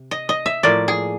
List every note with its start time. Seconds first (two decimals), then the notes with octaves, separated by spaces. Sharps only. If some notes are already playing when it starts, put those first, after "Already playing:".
Already playing: C3
0.11 D#5
0.29 D#5
0.46 E5
0.63 A2 F3 A#3 D5
0.88 G#4